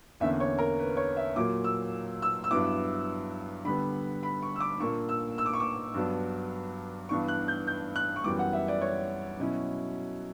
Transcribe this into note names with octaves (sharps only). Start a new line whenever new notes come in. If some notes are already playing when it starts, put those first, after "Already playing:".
E2 D3 A#3 C#4 E5
C#5
A#4
B4
C#5
E5
A#2 F#3 A#3 D6
E6
E6
E6
G2 F#3 B3 E4 D6
D3 G3 B3 B5
B5
C#6
E6
D6
A#2 A#3 D4 C#6
E6
E6
D6
C#6
D6
G2 F#3 B3 D4
G2 E3 B3 D4 C#6
F#6
G6
G6
F#6
C#6
F#2 E3 G3 B3 D6
F#5
E5
D5
C#5
B2 F#3 C#4 E4